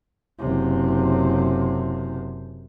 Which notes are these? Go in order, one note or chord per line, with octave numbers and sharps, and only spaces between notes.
F#1 C3